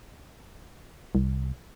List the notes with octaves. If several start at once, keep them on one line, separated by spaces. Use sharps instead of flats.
C2